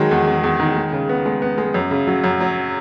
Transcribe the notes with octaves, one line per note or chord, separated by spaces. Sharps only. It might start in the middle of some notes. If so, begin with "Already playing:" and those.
Already playing: D#3 F#3 G#3
E2
E2
E2
D#3
G#3
C#3
B3
G#3
B3
G#3
F#2
C#3
F#3
F#2
F#3